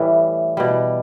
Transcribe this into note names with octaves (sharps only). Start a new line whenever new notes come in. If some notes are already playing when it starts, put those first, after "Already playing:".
Already playing: A2 E3 G3 E5
B2 G3